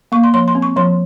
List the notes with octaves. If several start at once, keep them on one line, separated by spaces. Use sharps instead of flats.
A#3 C#6
C6
F3 C6
C6
C4
C#6
F3 C6